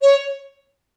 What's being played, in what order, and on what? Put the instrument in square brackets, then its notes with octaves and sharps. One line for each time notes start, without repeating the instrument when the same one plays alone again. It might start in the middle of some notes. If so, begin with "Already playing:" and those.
[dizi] C#5